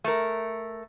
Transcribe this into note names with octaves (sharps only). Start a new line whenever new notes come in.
A3 A#4